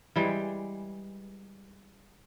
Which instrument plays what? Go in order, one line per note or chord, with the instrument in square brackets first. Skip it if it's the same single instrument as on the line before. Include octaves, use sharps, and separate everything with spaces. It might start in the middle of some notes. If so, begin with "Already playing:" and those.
[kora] E3 G3 G#3